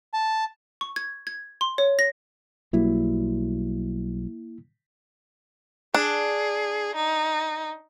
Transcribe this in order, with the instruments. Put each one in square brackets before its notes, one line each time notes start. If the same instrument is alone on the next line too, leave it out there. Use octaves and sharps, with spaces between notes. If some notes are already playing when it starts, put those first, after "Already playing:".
[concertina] A5
[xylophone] C#6
G#6
G#6
C6
C#5
A#6
[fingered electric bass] B1 F#3 G3 [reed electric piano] A#3 E4
[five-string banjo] D4 [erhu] G#4
[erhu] D#4